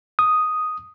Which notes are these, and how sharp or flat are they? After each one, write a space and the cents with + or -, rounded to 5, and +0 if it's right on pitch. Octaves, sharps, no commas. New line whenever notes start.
D#6 +0